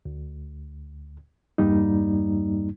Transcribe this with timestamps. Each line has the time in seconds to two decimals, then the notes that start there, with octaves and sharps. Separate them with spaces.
0.05 D2
1.58 E2 G2 G3 A#3 D#4